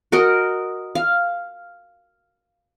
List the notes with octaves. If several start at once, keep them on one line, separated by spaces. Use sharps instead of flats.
F#4 A#4 D#5
F5